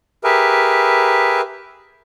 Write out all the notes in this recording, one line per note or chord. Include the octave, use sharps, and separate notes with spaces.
G4 G#4 A#4 B4 E5